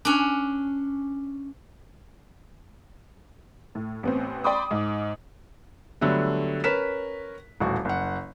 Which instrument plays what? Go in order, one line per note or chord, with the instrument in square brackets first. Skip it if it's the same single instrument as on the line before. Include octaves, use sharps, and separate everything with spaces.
[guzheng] C#4 D4
[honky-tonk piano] A2
A1 B3 C4
D5 G5 B5 C6 D6 D#6
G#2
[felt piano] D3 F#3 G3 A3 B3
C#4 A#4 B4 B6 E7
D#1 A1 F#4
F#1 F#5